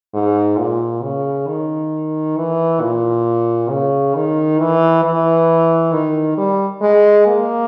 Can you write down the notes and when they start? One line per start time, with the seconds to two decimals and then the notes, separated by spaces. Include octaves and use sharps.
0.14 G#2
0.58 A#2
1.03 C#3
1.47 D#3
2.37 E3
2.81 A#2
3.69 C#3
4.15 D#3
4.59 E3
5.04 E3
5.93 D#3
6.37 G3
6.82 G#3
7.27 A#3